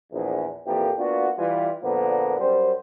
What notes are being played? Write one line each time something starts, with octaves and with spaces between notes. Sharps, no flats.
A#1 E2
F2 A#2 E3 F3 A#3 G4
A#3 B3 D4 F4 F#4
E3 G3 F4
A#2 D3 F3 A#3 B3
F#2 G3 C5